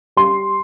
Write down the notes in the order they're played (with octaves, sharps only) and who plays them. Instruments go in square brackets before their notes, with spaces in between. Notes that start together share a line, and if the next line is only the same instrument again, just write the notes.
[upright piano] G3 C6